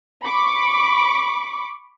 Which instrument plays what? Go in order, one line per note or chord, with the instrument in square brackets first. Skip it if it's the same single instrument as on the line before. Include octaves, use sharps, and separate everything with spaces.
[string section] B5 C#6 D6